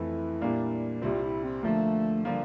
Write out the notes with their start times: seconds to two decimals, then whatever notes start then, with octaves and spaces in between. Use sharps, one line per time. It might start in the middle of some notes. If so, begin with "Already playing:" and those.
Already playing: F2 E3 A3 E4
0.41 A#2 G3 A#3 D4
1.01 C2 C3 G3 C4 F4
1.22 E4
1.43 C4
1.63 D3 F3 A3 A#3
2.25 D3 F3 G3 A#3 F4